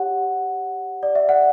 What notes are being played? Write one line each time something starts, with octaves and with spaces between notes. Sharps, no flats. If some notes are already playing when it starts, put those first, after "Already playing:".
Already playing: G4 C#5 F#5
D5
E5
F#5